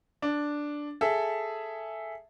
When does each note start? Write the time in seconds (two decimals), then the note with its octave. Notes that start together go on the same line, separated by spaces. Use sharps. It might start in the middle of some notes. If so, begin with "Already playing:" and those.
0.22 D4
1.01 G#4 A4 E5